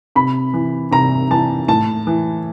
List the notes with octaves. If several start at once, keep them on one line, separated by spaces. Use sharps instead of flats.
C3 B5
E3
C3 A#5
E3 A5
A2 A5
E3